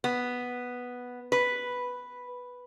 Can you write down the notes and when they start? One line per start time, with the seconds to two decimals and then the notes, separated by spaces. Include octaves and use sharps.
0.04 B3
1.32 B4